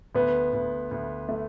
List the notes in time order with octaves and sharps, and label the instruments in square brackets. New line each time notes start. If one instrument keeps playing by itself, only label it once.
[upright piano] D2 [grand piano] B3
[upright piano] D2
D2
A3